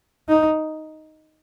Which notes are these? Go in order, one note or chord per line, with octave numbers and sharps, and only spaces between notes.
D#4